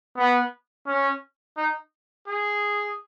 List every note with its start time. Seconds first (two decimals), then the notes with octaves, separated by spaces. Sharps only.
0.17 B3
0.87 C#4
1.57 D#4
2.27 G#4